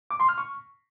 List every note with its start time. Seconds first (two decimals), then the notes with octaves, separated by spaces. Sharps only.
0.11 D6
0.20 C6
0.29 F6
0.38 C#6